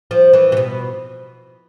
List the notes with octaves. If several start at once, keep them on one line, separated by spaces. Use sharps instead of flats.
F3
E3
C3
B2